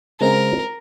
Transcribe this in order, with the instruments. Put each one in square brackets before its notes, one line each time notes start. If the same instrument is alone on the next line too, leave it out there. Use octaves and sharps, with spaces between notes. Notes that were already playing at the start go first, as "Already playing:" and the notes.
[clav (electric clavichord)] C#3 G#3 C4 [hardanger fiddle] A#4